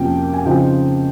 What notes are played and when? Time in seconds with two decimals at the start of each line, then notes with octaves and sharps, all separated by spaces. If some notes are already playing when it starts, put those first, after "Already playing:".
Already playing: F2 C3 F3 A#3 C#4 G5
0.34 G#5
0.45 C#3 F3 C4 D#4 G5